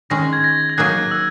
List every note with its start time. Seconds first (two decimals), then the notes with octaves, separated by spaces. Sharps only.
0.10 D#3 G#3 C#4 A#6
0.33 G#6
0.44 A#6
0.70 G#6
0.78 F#3 A#3 D#4 G#4 F#6
1.11 E6